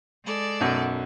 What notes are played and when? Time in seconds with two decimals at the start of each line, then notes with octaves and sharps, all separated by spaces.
0.25 G#3 A4 D5
0.60 B1 F#2